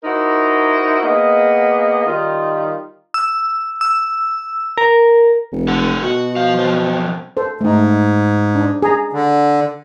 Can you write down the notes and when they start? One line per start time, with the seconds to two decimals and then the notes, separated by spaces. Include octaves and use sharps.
0.04 D#4 E4 F#4 A#4 C5
1.03 A#3 B3 G#4 D#5
2.06 D#3 G3 D#4 F4
3.14 E6
3.81 E6
4.78 A#4
5.52 F1
5.68 F#2 A4 F#5
6.03 B2 F#4
6.36 F3 F5
6.59 F#2 F3 C5
7.37 A4 C5
7.61 G#2 A3 D#4
8.55 D4
8.82 G#4 A#5
9.13 D3